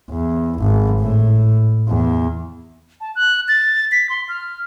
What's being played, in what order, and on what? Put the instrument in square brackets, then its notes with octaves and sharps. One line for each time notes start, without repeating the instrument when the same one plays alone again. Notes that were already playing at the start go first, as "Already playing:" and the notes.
[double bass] E2
G#1
A2
E2
[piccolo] A5
F#6
A6
B6
C6
F6